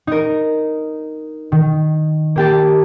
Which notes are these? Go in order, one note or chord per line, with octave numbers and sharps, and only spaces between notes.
D#4 A#4
D#3
A#3 G4 A5